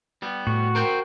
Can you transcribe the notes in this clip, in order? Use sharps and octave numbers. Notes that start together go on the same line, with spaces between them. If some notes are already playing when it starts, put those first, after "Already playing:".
G3 B3
A2 F#4
A#4 C5 G5